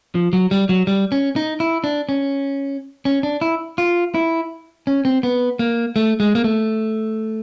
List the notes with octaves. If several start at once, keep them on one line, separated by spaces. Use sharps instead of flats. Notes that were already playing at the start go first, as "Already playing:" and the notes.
F3
F#3
G3
F#3
G3
C#4
D#4
E4
D4
C#4
C#4
D4
E4
F4
E4
C#4
C4
B3
A#3
A3
G#3
A#3
A3